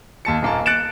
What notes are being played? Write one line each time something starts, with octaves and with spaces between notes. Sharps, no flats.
D#2 A5 C#7
D#1 A#3 A5
F#6 A6 C#7 D7 E7